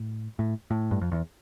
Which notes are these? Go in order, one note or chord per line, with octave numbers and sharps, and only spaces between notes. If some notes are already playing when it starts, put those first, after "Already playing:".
Already playing: A2
A2
A2
G2
F2
E2